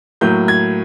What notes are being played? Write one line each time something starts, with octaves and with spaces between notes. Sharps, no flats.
A2 F#3 A#3 G6
G#6